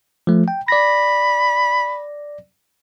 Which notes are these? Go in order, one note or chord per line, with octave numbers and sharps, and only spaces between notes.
F3 A3
G5
D5 B5 A#6